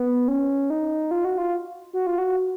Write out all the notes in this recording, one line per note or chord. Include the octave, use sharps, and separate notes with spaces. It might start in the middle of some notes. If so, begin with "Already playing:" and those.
Already playing: B3
C#4
D#4
F4
F#4
F4
F#4
F4
F#4